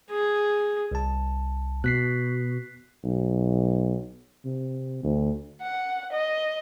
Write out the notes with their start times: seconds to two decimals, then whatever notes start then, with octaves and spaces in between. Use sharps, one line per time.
0.11 G#4
0.91 C2 A5
1.84 B2 F#6 B6 C7
3.04 B1
4.45 C3
5.03 D2
5.62 F#5
6.13 D#5